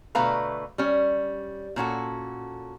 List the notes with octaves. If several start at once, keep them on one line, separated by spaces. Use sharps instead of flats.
B2 D3 A3 B4 F5 A#5
G3 C#4
A#2 C#4 F#4 A4